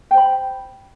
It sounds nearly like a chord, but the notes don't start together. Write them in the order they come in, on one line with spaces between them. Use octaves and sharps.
G5 C5 B5